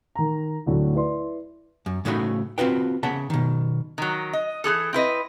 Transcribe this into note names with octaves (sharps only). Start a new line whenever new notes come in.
D#3 A#5
D2 A2 D3 F#3
E4 B4 D5 C6
F#2
A2 C#3 A3 D#4 F#4 B5
C4 C#4 F4 F#4 B4 G5
C#3 B3 E5 F#5 A5
B2 D#3
D#3 F#3
D#5
E3 F4 G#4 A4
C4 E4 B4 D#5